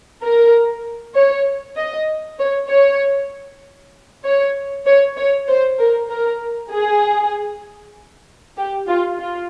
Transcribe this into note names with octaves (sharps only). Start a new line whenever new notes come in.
A#4
C#5
D#5
C#5
C#5
C#5
C#5
C#5
C5
A#4
A#4
G#4
G4
F4
F4